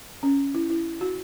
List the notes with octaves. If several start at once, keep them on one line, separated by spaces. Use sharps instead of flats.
C#4
E4
E4
F#4